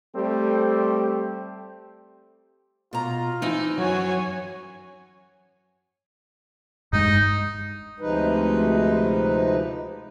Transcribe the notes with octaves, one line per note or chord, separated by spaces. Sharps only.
G3 A3 C4 G4
B2 F4 A#5
E3 C4 D#4
F#2 F#4 C#5 G#5
G2 G#3 D#4
D2 C3 F3 G#3 D#4 B4